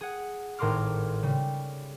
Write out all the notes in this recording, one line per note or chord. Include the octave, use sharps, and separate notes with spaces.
G#4 F#5
G#1 A2 A#4 C6 D6 F6
C#3 G3